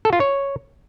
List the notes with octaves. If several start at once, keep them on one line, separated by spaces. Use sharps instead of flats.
A4
F4
C#5